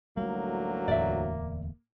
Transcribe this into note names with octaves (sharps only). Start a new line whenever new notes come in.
A1 D2 F#3 G3 A3 A#3
D1 E2 A2 D5 E5